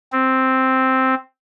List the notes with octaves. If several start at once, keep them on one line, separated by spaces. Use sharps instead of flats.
C4